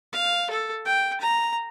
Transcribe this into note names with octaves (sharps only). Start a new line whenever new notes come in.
F5
A4
G5
A#5